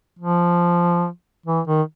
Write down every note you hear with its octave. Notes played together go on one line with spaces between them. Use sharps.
F3
E3
D#3